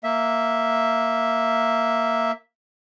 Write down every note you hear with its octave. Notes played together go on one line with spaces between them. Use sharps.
A#3 E5